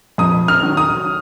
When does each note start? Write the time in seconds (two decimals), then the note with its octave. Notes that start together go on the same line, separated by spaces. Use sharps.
0.18 F2 D#6
0.48 F6
0.62 D#3 F#3
0.77 D#6